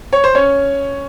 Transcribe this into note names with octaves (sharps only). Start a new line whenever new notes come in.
C#5
C5
C#4 C#5